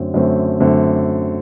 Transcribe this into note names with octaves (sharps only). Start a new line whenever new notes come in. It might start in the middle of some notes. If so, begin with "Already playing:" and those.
Already playing: F#2 D3 A3 C4
F#2 D3 A3 C4
F#2 D3 A3 C4